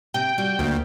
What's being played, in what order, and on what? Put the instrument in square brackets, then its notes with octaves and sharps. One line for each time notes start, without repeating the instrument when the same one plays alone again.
[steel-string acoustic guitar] C3 [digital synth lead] G5
[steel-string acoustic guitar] G3 F4 F#4
[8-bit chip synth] D2 [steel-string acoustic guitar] A#3